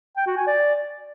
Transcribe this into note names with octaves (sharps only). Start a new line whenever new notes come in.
G5
F#4
G#5
D5